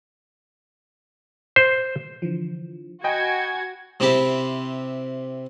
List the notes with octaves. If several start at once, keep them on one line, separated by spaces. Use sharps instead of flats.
C5
D3 E3 F3
F#4 D#5 G5 G#5 B5 G6 G#6
C3 C4 E4 G4